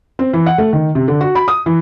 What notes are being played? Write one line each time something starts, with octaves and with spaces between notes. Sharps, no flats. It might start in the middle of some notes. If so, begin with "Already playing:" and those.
C4
E3
F#5
A3
D#3
C3
D3
F#4
B5
D#6
E3